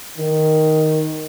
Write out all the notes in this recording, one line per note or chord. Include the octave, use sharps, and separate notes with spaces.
D#3